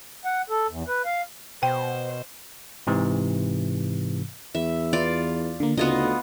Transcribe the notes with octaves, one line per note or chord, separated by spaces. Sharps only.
F#5
A4
E2
B4
F5
B2 C5 G5
G#2 C3 E3
E2 E5
E4 F4 B4 D5
D3 A#3
D2 C#3 A3 B3 D#4 F4 D#5